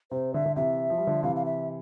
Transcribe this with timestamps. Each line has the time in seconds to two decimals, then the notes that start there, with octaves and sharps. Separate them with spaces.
0.11 C3 C5
0.34 D3 E5
0.46 D3
0.56 C3 E3 E5
0.90 F3
0.98 G3
1.07 D3 F3
1.23 C3 E3 F5
1.36 F5
1.46 E5